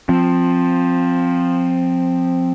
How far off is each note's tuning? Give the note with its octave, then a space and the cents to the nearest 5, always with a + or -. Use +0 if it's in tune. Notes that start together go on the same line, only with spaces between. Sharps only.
F3 +10 C4 +0